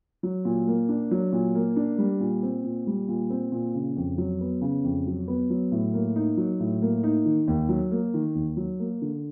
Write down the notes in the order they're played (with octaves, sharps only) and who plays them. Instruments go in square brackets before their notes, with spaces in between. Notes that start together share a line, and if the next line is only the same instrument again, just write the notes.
[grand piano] F#3
A#2
A#3
D4
F#3
A#2
A#3
D4
G3
A#2
C4
A#2
G3
A#2
C4
A#2
C#3
F2
F#3
B3
C#3
F2
F#3
B3
F#3
A2
A#3
D#4
F#3
A2
A#3
D#4
D#3
D#2
F#3
A#3
D#3
D#2
F#3
A#3
D3